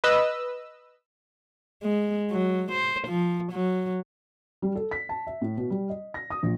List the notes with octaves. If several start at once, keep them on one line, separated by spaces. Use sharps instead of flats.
B4 D#5 E6
G#3
F#3
C5
F3
F#3
G3
A4
B6
A5
E5
A2
B2
G3
D#5
A#6
D#6
A#1